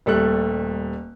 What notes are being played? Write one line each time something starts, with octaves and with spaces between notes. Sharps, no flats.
D#1 G3 A3 A4 F#6